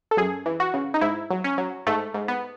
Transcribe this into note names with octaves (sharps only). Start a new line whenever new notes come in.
A4
F#2 G#4
E3
F#4
C#3
D#4
G#2 E4
F#3
C#4
F#3
G#2 A3
G#2
B3